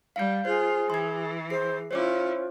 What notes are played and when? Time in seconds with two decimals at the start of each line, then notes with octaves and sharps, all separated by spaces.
0.16 G3 F5 G6
0.45 F4 G#4 C5
0.90 E3 C6 G#6
1.50 G#4 C5 C7
1.91 C#4 E4 F4 C5 C#5 D6